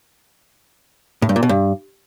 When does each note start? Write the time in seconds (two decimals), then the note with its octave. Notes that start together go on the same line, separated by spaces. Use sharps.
1.22 A2
1.29 G2
1.36 A#2
1.43 B2
1.49 G2